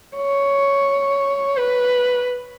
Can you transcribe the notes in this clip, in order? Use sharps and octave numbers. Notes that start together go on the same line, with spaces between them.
C#5
B4